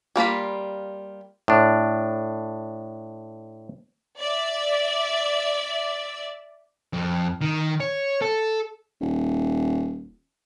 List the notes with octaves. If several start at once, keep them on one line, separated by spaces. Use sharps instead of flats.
G3 A#3 F4 B5
A2 D4
D5 E5
F2
D#3
C#5
A4
D#1